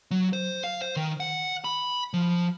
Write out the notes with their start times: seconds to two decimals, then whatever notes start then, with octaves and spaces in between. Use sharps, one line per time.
0.11 F#3
0.33 C5
0.64 F5
0.82 C5
0.97 D#3
1.20 F#5
1.64 B5
2.14 F3